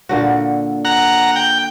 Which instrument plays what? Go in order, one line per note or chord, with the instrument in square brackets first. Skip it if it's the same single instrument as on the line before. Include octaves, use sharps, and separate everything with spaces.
[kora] A#2 D3 F#4
[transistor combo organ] F#5 A#5
G5